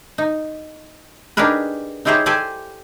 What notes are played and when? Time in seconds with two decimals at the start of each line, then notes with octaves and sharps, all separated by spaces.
0.18 D#4
1.37 D4 D#4 G4 G#4 A#4 B4
2.05 D#4 E4 G4 G#4 C5 C#5
2.26 G4 A4 C5 D5 G#5